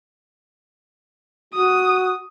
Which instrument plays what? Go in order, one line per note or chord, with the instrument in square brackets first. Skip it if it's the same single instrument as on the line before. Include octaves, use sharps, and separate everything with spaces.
[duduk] F#4 [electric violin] D#6